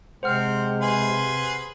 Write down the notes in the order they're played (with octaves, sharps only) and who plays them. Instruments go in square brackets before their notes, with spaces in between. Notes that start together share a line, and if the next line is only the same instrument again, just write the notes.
[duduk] C3 [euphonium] G#3 [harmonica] C4 [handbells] C5 F#5 F6
[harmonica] G#4 B4 C6